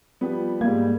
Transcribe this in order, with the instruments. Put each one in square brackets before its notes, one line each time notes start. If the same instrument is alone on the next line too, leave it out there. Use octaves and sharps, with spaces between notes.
[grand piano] F3 G3 B3
[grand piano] G#2 G3 G#6 [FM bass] A#3